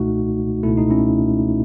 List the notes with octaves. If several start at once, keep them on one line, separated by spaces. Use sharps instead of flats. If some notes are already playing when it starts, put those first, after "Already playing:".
Already playing: C#2 B2 A3 D#4 F#4
C#2 B2 A3 E4
D#4
C#4 E4